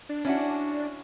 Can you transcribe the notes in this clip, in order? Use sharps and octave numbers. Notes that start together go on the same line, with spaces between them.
D4
C#4 E4 F#4